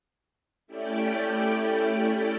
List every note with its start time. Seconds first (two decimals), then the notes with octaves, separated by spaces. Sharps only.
0.67 A3 C#4 E4 G4 D5 G5